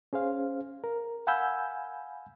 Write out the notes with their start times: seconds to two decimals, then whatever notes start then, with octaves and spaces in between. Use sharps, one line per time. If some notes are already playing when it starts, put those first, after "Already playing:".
0.13 C#4 G#4 C5 F5
0.84 A#4
1.27 F5 F#5 G#5 B5 E6 G6